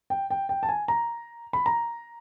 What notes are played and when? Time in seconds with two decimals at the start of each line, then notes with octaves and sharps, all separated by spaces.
0.10 G5
0.30 G5
0.49 G5
0.63 A5
0.69 G#5
0.88 A#5
1.53 B5
1.66 A#5